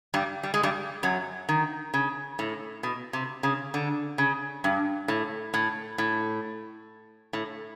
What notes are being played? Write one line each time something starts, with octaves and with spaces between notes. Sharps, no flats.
G2 G3
G3
G#3
G2 G3
F#2 F#3
D#3
C#3
A2
B2
C3
C#3
D3
C#3
G2
A2
A2
A2
A2